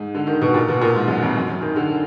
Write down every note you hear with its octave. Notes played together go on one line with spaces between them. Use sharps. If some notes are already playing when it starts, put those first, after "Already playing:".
Already playing: G#2
D3
D#3
B2
A#2
B2
A#2
G#2
F#2
F2
F#2
F#2
D#3
D3